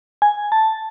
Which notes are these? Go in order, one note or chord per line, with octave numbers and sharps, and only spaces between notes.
G#5
A5